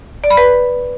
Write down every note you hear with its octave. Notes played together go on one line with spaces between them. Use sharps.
D5
B5
B4